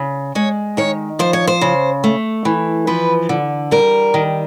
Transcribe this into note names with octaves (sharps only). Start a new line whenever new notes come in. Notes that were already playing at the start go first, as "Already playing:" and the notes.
Already playing: C#3
G#3 C#5
D#3 C#5
F3 C5
C#5
C5
C#3
A3
E3
F3 B4
D3
G3 A#4
D#3